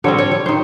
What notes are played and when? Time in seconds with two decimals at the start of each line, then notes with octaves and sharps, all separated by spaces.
0.04 D3 G3 C4 C#5
0.18 C#5
0.31 C#5
0.46 D#3 C5